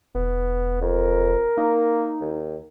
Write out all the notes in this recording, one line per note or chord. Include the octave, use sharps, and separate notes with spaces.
E1 B3
F2 A#4
A#3 D#4
D#2